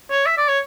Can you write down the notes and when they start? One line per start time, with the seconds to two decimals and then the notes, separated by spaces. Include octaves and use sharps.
0.11 C#5
0.26 E5
0.38 D5
0.48 C#5